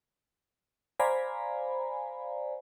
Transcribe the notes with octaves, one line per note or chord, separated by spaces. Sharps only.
C5 D5 F5 G#5 A#5 B5